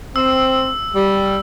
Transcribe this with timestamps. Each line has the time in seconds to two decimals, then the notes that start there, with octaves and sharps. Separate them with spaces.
0.16 C4 E6
0.95 G3